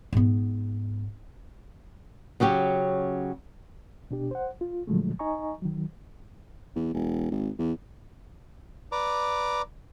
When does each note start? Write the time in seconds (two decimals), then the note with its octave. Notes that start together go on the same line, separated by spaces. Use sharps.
0.13 G#2 B3
2.40 C#3 F#3 C#4 G4
4.11 B2 D4 G4
4.31 C5 F#5
4.61 F4
4.87 A#2 D3 F3 F#3 G#3 A3
5.19 D#4 D#5 G#5 A#5 C#6
5.62 D#3 F#3
6.75 E2
6.94 E1
7.31 G#1
7.58 E2
8.92 B4 D5 A#5 D6